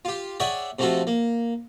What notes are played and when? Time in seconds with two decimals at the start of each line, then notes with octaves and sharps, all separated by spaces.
0.05 F4 G4
0.40 G#4 C#5 D5 E5 F#5 G5
0.79 C3 F3 A3 F4 F#4 A4
1.07 A#3